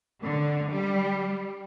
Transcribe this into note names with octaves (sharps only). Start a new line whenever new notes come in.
D3
G3